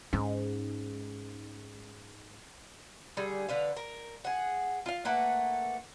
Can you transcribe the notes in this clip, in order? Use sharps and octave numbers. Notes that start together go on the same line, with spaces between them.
G#2 C#4
D3 G3 G#4
D3 B4 F5
A#4
G#4 F#5
F4 F5
A3 A#3 B4 F#5